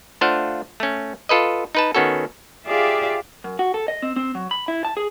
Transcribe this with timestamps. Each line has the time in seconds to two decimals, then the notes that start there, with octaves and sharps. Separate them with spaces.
0.21 A3 D4 F4 C5 F5 F#5
0.80 A3 C#4
1.29 F4 A4 B4 D#5
1.75 D#4 B4 A5
1.95 D#3 B3 C#4 F#4 A4
2.65 F4 G4 G#4 D5 E5 F5
3.44 F#2
3.59 F#4
3.74 A4
3.88 D#5
4.02 C4
4.16 C4
4.35 F#3
4.51 B5
4.68 E4
4.85 A5
4.97 G#4